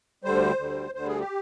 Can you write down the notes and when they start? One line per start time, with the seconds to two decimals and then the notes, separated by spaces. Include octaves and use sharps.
0.24 D2 D3 G3 C5
0.59 D2 D3 G3
0.94 D2 D3 G3 C5
1.07 G#4
1.19 G4